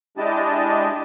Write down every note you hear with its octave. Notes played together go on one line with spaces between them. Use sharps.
G#3 D4 E4 G4 D#5 A5